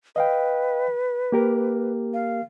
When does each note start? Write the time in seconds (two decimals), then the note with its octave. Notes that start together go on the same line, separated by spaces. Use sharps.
0.16 B4 D#5 F5 G5
1.32 A#3 G4 A#4
2.14 F5